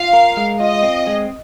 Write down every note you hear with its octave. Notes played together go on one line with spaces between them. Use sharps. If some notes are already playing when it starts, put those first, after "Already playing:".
Already playing: F4 F5
A#4
G#3
F4 D#5
C4
G#3